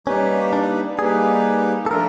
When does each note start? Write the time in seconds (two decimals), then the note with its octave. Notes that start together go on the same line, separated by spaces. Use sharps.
0.07 G3 A#3 C#4 D#4 G4 B4
0.53 D4
0.99 G3 A#3 D#4 G4 G#4 B4
1.86 A4
1.91 F3 A3 D4 F4 A#4